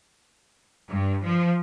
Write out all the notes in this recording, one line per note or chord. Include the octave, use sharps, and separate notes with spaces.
G2
F3